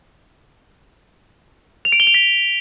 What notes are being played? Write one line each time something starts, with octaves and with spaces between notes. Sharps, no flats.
F7
D7
G7
F7
B6